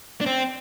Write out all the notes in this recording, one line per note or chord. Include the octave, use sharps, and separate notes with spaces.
D4
C4